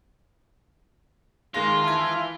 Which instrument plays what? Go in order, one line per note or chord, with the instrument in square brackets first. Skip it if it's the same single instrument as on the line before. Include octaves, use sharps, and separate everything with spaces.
[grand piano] D#3 G#3 A#6 [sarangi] A#3 [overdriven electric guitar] F4
[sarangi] E3 [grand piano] A5 G#6